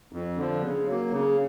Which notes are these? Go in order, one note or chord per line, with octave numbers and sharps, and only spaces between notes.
F2
D3 F3
C#3
F#3 A#3
C#3